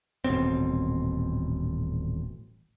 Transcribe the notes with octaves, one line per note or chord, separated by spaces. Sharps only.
D#1 A1 B2 C4